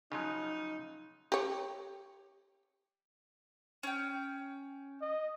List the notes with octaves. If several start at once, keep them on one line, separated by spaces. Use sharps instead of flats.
C#3 F3 F#3 D#4
G4 C#5
C#4 G5
D#5